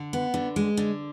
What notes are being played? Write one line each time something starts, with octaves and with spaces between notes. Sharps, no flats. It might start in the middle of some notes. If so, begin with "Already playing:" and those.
Already playing: D3
B3
D3
G#3
D3